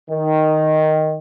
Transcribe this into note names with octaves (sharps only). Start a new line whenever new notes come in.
D#3